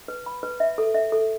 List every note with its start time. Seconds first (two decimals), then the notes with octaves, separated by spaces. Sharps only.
0.08 B4
0.26 B5
0.43 B4
0.60 E5
0.78 A4
0.95 E5
1.12 A4